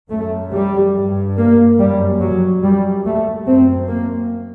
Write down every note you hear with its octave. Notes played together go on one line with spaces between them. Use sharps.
F#2 A3
G3
G2
A#3
F#2 G3
F#3
F#2 G3
A3
F#2 C4
A#3